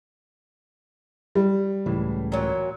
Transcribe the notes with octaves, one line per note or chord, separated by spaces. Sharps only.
G3
C#2 A2 E3
A#2 F#3